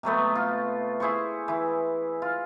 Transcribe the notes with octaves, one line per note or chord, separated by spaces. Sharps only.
C3 F#3 A3 B3
F4
E4 G#4 C5 C#6
E3 E4
F4